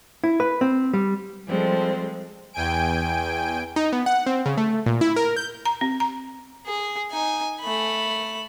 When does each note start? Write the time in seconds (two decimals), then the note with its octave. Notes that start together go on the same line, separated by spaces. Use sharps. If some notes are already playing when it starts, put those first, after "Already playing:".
0.24 E4
0.40 B4
0.61 C4
0.93 G3
1.46 F3 G3 G#3 C4 A4
2.53 E2 G5 G#5 D7
3.76 D#4
3.93 B3
4.06 F#5
4.26 C4
4.46 C#3
4.57 A3
4.86 A#2
5.01 E4
5.16 A#4
5.36 G6
5.65 A#5
5.81 C4
6.00 A#5
6.66 G#4
7.11 D#4 G#5
7.60 A3 B5